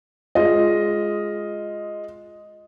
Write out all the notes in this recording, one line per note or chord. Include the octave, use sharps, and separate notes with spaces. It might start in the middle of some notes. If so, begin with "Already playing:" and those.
G#3 F4 D#5